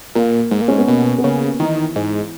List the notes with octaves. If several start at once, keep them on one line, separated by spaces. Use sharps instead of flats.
A#2 A#3
G#2
A#2
G#2 C#4
B3
B2 A#3
B3
C#3 A#3
D#3 E3
G#2